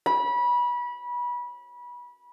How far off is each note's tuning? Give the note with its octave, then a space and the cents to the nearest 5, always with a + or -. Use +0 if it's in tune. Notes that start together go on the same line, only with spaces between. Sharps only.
B5 -25